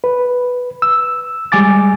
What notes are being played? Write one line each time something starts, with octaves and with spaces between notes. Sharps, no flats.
B4
E6
G3 G#3 G#5 D6 A6